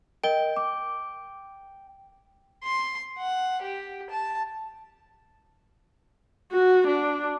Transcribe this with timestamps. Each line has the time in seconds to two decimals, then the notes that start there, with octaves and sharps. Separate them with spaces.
0.24 A#4 D#5 G5 G7
0.57 D6
2.64 C6
3.19 F#5
3.62 G4
4.10 A5
6.52 F#4
6.87 D4